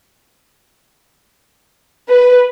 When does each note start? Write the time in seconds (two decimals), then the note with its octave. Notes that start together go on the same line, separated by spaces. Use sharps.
2.09 B4